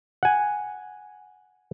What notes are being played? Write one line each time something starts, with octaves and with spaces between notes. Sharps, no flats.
F#5 G#5